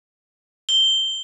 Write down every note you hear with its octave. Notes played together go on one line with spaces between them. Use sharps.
G7